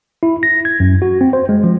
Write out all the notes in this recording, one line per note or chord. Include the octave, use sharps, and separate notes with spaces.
E4
A#6
G#6
F#2
F#4
C4
C5
G#3
F3